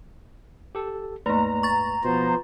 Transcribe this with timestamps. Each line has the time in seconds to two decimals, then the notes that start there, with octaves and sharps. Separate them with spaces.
0.75 G4 A4
1.26 D#2 G#2 A3 A#3 B4 A#5
1.63 C#6 A6
2.04 B2 F3 B3 C5